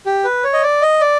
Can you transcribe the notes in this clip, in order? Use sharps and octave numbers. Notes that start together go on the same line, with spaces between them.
G4
B4
C#5
D#5
D5
D#5
D5